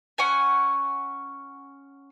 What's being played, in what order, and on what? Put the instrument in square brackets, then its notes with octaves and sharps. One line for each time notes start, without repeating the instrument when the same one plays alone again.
[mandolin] C#4 F#5 G#5